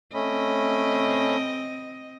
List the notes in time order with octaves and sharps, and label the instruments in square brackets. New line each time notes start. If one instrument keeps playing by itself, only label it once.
[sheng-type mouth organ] A3 C#4 B5 [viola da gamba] C4 D#5